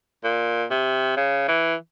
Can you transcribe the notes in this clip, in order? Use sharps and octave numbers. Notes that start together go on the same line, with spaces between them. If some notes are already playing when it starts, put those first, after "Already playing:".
A#2
C3
C#3
E3